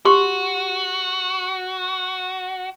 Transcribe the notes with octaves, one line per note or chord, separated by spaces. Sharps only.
F#4 G4 C6 C#6